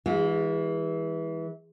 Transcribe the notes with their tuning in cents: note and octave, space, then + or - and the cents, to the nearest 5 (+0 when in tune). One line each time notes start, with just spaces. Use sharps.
E3 -20 G#3 -40 F4 +45